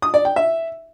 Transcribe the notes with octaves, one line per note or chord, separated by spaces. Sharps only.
D#6
D5
G5
E5